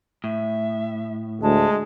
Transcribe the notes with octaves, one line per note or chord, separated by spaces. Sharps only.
A2 E5
D2 G#3 A5